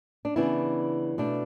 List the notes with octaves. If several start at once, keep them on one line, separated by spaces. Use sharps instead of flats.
D4
C#3 E3 B3 D4 E4
B2 A3 D4